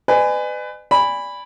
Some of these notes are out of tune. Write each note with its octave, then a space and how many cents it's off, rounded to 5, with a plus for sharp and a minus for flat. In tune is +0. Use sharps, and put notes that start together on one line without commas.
B4 +30 D5 +45 G#5 -5
D5 -15 G#5 -25 B5 +0